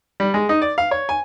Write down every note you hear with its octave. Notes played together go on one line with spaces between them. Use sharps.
G3
G#3
D#4
D5
F5
C#5
G#5